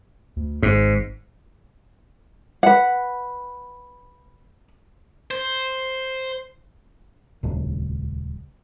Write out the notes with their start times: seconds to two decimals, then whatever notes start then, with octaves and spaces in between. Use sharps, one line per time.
0.36 D2
0.63 G#1 G#2
2.63 B4 F#5
5.31 C5
7.43 D#1 C#2 F#3